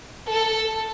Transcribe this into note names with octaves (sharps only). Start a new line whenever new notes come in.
A4